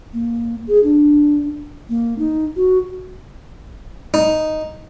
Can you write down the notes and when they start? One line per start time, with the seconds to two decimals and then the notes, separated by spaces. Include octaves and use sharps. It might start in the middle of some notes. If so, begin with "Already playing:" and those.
0.14 A#3
0.68 G#4
0.84 D4
1.90 A#3
2.19 D#4
2.56 F#4
4.14 D#4